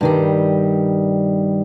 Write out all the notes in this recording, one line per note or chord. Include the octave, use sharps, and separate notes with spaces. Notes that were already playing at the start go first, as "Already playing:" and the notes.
G2 D#3 G3